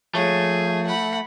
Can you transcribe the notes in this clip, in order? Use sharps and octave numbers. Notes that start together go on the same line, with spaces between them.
F3 A3 G#4 C#5
F#5 B5